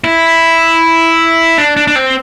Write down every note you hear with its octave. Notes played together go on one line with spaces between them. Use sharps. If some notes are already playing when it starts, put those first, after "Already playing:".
E4
D4
D4
D4
C4